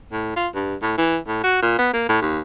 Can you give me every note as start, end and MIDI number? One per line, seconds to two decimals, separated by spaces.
0.12 0.32 45
0.36 0.48 65
0.55 0.75 43
0.82 0.93 45
0.98 1.18 52
1.28 1.42 45
1.44 1.58 66
1.62 1.77 46
1.78 1.92 59
1.93 2.06 58
2.09 2.20 45
2.21 2.41 39